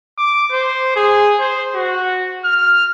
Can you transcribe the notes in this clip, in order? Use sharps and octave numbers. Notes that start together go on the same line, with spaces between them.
D6
C5
G#4
C5
F#4
F6